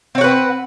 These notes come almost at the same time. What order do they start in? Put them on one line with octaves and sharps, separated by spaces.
C4 C#5 F#5 B4